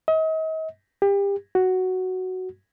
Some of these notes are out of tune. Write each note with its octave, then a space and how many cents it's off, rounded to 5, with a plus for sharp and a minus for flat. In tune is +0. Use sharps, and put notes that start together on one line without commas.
D#5 +40
G4 +30
F#4 +5